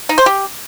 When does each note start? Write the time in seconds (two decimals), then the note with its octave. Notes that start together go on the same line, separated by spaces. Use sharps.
0.09 D#4
0.18 C5
0.26 G4